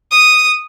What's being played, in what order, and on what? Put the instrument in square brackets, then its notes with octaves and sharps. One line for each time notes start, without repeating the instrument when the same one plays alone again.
[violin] D#6